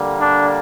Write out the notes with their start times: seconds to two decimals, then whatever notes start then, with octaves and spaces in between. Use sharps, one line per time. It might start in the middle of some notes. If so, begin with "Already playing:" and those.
Already playing: D3 G3 A#3
0.21 D4